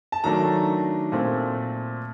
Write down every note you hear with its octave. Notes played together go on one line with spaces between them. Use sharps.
A5
D#3 F#3 A3 D4 A#5
A#2 A3 C4